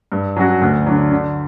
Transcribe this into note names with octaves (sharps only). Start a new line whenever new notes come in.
G2
F#3 C#4 F#4
D2
D3 F#3
D3